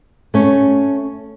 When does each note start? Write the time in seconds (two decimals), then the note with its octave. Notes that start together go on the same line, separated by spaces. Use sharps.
0.34 A3 C#4